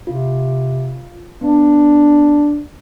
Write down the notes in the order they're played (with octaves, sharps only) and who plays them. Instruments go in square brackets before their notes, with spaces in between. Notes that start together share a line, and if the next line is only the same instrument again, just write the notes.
[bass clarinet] C3 [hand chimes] F4
[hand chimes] B3 [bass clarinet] D4